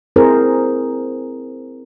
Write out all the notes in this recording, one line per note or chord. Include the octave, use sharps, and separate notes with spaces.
C4 E4 G#4 A#4 C5